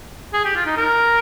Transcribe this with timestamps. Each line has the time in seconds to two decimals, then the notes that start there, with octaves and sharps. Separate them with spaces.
0.33 G#4
0.45 G4
0.56 F4
0.66 D#4
0.77 A#4